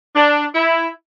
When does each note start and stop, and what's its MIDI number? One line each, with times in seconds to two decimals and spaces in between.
0.16 0.45 62
0.55 0.88 64